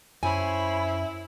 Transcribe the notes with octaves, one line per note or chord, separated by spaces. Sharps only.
F#2 E4 C5 C#5 G#5 B5